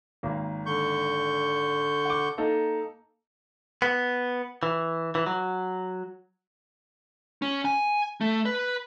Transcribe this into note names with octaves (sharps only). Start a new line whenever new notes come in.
G#1 A#3
D3 C#6 G6
F#5 D6
A#3 D#4 A4
B3
E3
E3
F#3
C#4
G#5
A3
B4